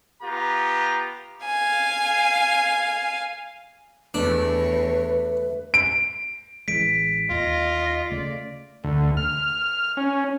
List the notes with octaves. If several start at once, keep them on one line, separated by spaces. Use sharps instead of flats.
B3 F4 G4 A#5
F5 G#5
E2 A3 D4 B4 C#5
D7
A1 E3 G#3 B6 D7
D#2 F4 D#5 A#6
C#3 A3 D5
D2
F6
C#4